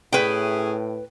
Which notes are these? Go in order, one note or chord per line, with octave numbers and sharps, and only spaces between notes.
A2 C#4 E4 G#4 B4 G5